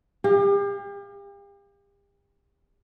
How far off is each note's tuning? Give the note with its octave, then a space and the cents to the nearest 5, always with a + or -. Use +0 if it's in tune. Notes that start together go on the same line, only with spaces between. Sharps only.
G4 +40 F5 +5